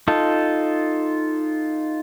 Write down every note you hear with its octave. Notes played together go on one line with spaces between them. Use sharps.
D#4 F4 A4